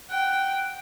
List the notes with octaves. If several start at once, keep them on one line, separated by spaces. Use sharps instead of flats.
F#5 G5